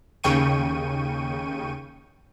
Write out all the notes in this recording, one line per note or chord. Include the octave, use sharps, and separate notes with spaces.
D#2 C#3 G5 C#6 D#7